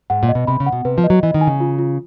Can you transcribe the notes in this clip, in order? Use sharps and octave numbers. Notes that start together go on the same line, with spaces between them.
G#2 F#5
A#2
D#5
B2
C3 B5
C#3
F#5
B2
C3 B4
F3
D#5
F#3
E3 D#5
D#3
G#5
C#3
F4
F4